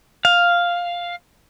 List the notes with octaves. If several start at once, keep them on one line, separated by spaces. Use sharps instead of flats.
F5